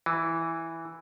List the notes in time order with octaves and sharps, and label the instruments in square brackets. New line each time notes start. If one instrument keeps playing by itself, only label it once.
[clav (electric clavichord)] E3